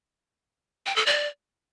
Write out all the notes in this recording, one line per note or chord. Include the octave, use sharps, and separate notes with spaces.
G5
A4
D5